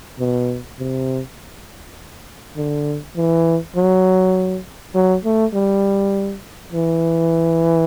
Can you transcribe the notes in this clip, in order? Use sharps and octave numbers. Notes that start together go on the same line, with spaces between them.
B2
C3
D3
E3
F#3
F#3
A3
G3
E3